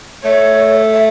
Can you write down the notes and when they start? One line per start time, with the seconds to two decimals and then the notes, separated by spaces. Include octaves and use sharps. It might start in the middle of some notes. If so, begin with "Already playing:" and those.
0.23 A3 C#5
0.93 E5